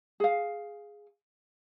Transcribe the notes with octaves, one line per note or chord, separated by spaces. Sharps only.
G#4 F5